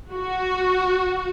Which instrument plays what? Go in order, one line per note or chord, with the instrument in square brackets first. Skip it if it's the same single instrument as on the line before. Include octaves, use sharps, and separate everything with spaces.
[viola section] F#4